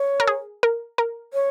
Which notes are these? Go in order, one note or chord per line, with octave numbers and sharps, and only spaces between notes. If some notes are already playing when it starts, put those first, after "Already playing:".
Already playing: C#5
A#4
G#4
A#4
A#4
C#5